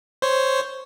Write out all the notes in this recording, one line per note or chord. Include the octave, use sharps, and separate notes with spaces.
C5 C#5